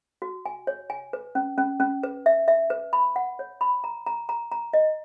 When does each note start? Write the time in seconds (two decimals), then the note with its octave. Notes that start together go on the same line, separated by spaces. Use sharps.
0.22 F#4
0.46 G#5
0.67 C#5
0.90 G#5
1.13 B4
1.35 C#4
1.58 C#4
1.80 C#4
2.03 B4
2.26 E5
2.48 E5
2.70 B4
2.93 B5
3.16 F#5
3.39 C#5
3.61 B5
3.84 A#5
4.06 A#5
4.29 A#5
4.52 A#5
4.74 D#5